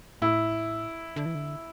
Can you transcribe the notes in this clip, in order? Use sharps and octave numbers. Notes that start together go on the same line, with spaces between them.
A2 E4
D3
E3
D3